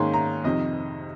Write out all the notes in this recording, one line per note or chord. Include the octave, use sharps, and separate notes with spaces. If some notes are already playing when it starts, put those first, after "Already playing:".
Already playing: G#2 D#3 A#3 C#4 C6
A#5
F2 C3 D#3 D#5